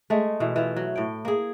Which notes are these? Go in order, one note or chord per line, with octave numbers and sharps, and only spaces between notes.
G#3 A3
B2 E3
E3 F4
F#3
A2 G5
A#3 G#4